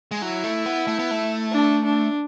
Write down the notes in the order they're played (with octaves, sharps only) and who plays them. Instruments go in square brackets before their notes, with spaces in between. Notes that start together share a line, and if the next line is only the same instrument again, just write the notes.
[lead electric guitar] G#3
[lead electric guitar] F#3 [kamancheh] E4
[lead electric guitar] A3
B3
A3
B3
A3
[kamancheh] D4
D4